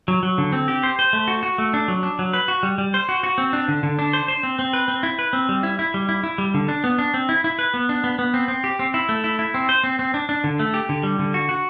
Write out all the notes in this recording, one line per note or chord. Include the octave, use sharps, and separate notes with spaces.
F#3
F#3
D3
C4
G4
C5
C5
A3
F#4
F#4
A3
D4
F#3
D4
F#3
B4
F#4
G3
G3
C5
F#4
F#4
C4
D4
D3
D3
D4
C5
C5
C4
C4
B4
C4
E4
B4
C4
G3
E4
E4
G3
E4
E4
G3
D3
D4
B3
D4
C4
E4
E4
B4
B3
D4
B3
B3
C4
C4
G4
C4
E4
A3
E4
E4
C4
C5
C4
C4
D4
D4
D3
A3
G4
D3
G3
D3
F#4
F#4